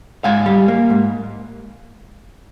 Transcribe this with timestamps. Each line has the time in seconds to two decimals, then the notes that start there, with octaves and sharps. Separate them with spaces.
0.24 G#2 F5 G#5
0.46 G3
0.68 A#3
0.90 G#2